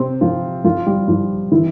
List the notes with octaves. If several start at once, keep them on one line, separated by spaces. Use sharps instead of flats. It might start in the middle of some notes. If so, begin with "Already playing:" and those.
Already playing: C3 C4
F3 F4
F3 F4
G3 G4
F3 F4
E3 E4